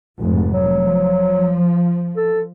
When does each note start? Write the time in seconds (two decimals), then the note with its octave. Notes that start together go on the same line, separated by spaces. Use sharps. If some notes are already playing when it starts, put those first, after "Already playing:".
0.20 F1 G#2
0.53 F#3
0.83 F3
2.17 A4